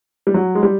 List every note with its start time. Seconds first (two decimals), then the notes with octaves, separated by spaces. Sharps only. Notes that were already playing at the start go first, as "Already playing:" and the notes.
0.27 G3
0.34 F#3
0.55 G#3
0.63 G3